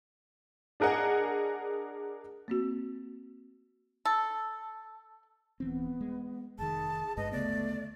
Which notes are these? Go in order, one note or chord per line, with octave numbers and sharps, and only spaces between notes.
D4 G#4 A#4 D#5 F#5 G#5
A#3 C4 F#4
A4
D#1 E3 B3 C4
G#3
F1 D#3 G#4 A5
G1 G2 G#3 B4 D#5
D2 C#3 A3 B3 D5